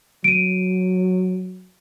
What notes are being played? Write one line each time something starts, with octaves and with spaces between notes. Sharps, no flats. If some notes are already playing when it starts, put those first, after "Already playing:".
F#3 D7 D#7